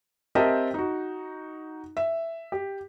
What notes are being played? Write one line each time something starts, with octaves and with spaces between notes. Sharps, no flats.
C4 G4 A#4 D#5 E5 A5
D#4 F#4
E5
G4